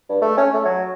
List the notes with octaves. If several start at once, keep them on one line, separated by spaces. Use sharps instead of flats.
G2
A3
C#4
A3
F#3